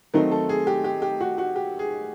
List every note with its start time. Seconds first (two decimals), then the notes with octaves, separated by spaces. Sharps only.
0.14 D#3 F#3 A3 C4 D#4 A#4
0.31 A4
0.49 G#4
0.67 G4
0.84 G4
1.02 G4
1.20 F#4
1.38 F#4
1.56 G4
1.79 G#4